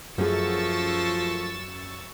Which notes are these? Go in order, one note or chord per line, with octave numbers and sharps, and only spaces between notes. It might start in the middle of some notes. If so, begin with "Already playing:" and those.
F#2 F3 A3 G#4 C#6 E6 A6